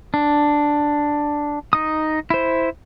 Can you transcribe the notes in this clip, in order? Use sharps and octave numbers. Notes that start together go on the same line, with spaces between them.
D4
D#4 D#6
E4 C5